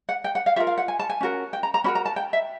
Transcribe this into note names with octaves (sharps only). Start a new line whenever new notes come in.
F#5
G5
F#5
F5
F4 A#4 E5
F5
F#5
G#5
A5
G#5
C#4 F#4 A#4
G5
A#5
A#5
C#4 F#4 A#4 B5
A#5
A5
G5
E5